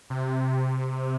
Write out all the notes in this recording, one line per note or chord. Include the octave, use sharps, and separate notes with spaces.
C3